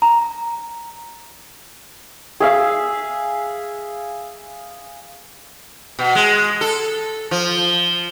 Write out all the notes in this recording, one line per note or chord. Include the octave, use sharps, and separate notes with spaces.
A#5
G#4 E5 F5
B2
G#3
A4
F3